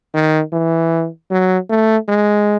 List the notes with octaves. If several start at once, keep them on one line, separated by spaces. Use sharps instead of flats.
D#3
E3
F#3
A3
G#3